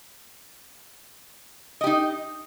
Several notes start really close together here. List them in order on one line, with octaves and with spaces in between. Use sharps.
D#5 G4 D#4